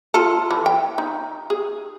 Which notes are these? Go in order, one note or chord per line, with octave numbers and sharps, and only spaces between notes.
F4 A4
E3
G5
D#4
G#4